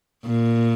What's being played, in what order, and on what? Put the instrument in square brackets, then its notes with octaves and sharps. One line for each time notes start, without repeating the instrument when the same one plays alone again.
[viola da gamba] A#2